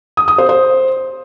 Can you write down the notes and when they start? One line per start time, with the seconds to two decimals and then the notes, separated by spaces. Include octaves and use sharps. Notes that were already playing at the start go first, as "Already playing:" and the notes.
0.17 D#6
0.28 D#6
0.38 C5
0.49 C5